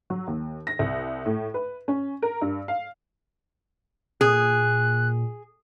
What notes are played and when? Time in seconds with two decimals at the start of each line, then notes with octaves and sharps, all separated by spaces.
0.10 F#3
0.27 D#2
0.67 A#6
0.79 C2
1.25 A2
1.54 B4
1.88 C#4
2.22 A#4
2.41 G2
2.68 F5
4.21 A#2 G#4 F#6